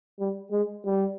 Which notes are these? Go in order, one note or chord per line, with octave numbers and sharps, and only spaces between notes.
G3
G#3
G3